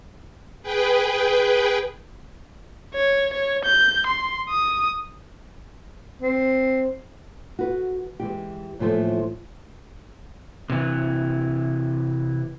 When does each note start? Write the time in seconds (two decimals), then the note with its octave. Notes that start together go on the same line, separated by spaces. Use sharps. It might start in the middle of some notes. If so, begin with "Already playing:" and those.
0.63 G#4 B4 G5
2.94 C#5
3.33 C#5
3.65 G6
4.06 C6
4.49 D#6
6.22 C4
7.59 F#4 B4
8.20 E3 G#3 G4
8.79 D#2 A2 E3 F3 A3
10.70 C3 E3